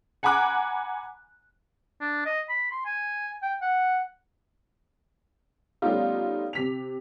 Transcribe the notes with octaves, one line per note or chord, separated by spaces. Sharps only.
F#5 G#5 A#5 B5 D6 F#6
D4
D#5
B5
C6
G#5
G5
F#5
G3 A3 B3 C#4 D#4 F4
C3 B6 F7